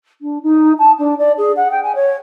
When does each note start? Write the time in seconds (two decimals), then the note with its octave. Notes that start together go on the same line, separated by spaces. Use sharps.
0.22 D4
0.43 D#4
0.79 A5
0.99 D4
1.18 D5
1.38 G#4
1.56 F#5
1.71 G5
1.83 G#5
1.95 C#5